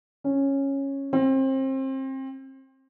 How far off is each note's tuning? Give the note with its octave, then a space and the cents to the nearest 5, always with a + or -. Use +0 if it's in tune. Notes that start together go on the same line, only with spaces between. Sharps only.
C#4 -10
C4 +30